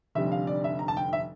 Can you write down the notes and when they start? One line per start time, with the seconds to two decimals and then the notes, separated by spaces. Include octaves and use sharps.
0.15 F1 F2 D3 G3 E5
0.32 F5
0.47 D5
0.64 E5
0.79 A#5
0.88 A5
0.97 G5
1.13 E5